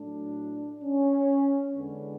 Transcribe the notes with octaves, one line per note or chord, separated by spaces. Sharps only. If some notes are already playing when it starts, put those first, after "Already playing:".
Already playing: A2 F#3 A3 D4
C#4
E2 D3 G#3 B3 D4